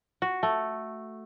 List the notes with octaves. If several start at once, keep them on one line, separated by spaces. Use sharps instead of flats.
F#4
A3